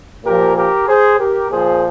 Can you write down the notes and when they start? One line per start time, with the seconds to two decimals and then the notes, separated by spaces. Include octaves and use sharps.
0.25 A#2 F3 G4 A#4
0.56 G4 A#4
0.88 G#4 C5
1.19 G4 A#4
1.51 A#2 F3 G#4 C5